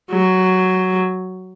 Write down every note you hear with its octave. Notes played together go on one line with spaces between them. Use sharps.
F#3